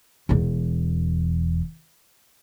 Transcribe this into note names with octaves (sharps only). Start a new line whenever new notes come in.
E1 E2